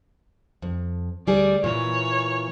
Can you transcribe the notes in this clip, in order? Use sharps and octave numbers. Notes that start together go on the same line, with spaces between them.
F2
D2 G3 G#4 D5
A#2 E3 C#5